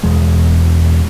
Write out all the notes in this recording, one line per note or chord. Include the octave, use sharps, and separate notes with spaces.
E1 E2 G#3